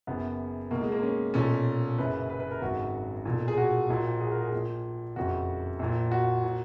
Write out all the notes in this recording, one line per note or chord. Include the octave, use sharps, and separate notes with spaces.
F#1 F#2 C#3 B3
B1 B2 A#3
G#3
A#3
C#4
B1 A#2 C#4
F#1 F#2 C#3 B4
B4
B4
A#4
G#1 F#2 C#3 F#4
B1 A#2
G#4
F#4
A#1 A#2
G#4
A#4
G#4
A#1 A#2
F#1 F2 C#3 F#4
A#1 A#2
F#4
A#2